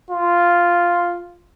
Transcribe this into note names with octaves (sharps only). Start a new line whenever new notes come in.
F4